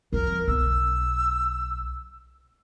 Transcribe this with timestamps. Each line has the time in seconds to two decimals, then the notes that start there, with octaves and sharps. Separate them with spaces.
0.13 F2 F3 A#4
0.48 B1 E6